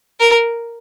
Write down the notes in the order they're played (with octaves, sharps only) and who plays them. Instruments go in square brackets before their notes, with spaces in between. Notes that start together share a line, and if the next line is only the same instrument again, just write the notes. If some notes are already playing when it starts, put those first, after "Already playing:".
[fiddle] A#4